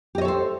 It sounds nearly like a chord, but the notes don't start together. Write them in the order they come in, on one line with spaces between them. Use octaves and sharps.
G4 D#5 C#5 A4 C5